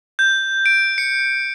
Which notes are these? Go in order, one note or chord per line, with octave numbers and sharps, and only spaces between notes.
G6
D7
C#7